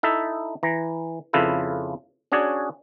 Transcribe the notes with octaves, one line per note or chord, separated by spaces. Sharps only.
D#4 E4 A4 E5
E3 A#5
F2 C#3 E4 F4 A4 B4
C#4 D4 F#4 G#4 C#5 D5